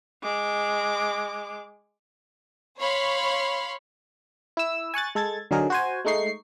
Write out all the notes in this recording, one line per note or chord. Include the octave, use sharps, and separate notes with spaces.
G#3 D6
C#5 F5 B5 C6
E4 E6
G#5 C#6 F#6 A6
G#3 A4 G#6 A6
D3 F#3 D#4 G#4 A#4
F#4 C5 G#5
G#3 A3 D#4 C#6 C7